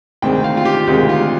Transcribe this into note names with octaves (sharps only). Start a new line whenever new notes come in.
D2 C3 D#3 G#3 C4 G5
F5
F4
G4
D2 C3 D#3 G#3 C4 G4
F4